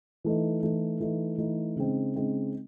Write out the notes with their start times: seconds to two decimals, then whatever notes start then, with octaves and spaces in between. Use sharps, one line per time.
0.24 E3 A3 D#4
0.63 E3 A3 D#4
1.00 E3 A3 D#4
1.38 E3 A3 D#4
1.76 C#3 G#3 C4 D#4
2.14 C#3 G#3 C4 D#4